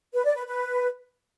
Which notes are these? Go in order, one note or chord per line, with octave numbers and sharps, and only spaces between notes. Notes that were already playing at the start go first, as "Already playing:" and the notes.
B4
D5
B4
B4